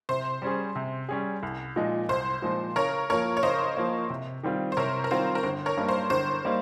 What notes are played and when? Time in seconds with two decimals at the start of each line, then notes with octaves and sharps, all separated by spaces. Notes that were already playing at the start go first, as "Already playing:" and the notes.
0.09 C3 C5
0.42 G3 C#4 G#4
0.76 C3
1.09 G3 C#4 G#4
1.43 C2
1.76 A#2 F3 G#3 D#4
2.09 C2 C5
2.42 A#2 F3 G#3 D#4
2.76 C#3 A#4 C#5
3.10 F3 A#3 A#4 C#5
3.37 C#5
3.43 C#3 C5 D#5
3.77 F3 A#3
4.10 C3
4.43 D#3 G3 C4 F4
4.72 C5
4.77 C3 A#4 C#5
5.04 A#4
5.10 D#3 G3 C4 F4 C5
5.35 A#4
5.43 G1 C5
5.66 A#4 C#5
5.77 G2 G3 A#3 D#4
5.89 C5
6.10 G1 C5
6.45 G3 A#3 D#4